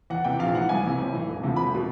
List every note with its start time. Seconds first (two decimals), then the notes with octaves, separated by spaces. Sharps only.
0.10 E2 F#5
0.24 C3 E3 G5
0.39 A#1 F5
0.55 G#2 E3 F#5
0.69 C2 G#5
0.83 C3 E3
0.98 B1
1.12 A2 E3
1.27 E1
1.42 D2 C3 F3
1.56 E1 B5
1.75 B2